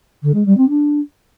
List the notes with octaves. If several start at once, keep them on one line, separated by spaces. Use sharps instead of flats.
D3
G#3
G3
C4
D4